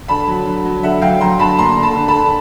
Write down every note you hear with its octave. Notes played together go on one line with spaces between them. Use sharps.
D3 A5 B5
F#3
D3
F#3
D3 E5 F#5
F#3 F5 G5
F#3 A#5 C6
D3 A5 B5
A#3 A#5 C6
D3
A5 B5
D3
A5 B5
D3